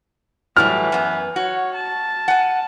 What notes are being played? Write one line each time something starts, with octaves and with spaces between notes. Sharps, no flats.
A2 E3 F#3 G3 F6
F#2 B3
F#4 C#5
A5
F#5 G#5